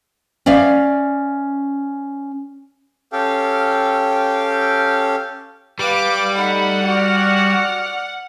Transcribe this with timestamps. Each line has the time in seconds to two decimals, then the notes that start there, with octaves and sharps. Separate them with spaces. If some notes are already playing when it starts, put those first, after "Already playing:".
0.46 C#4 D5 E5 F5
3.13 C#4 G4 A4 F5 G5
5.79 G3 B4 F5 D6
6.35 A3 D#4 F#5 B5
6.85 F#4 D5 F6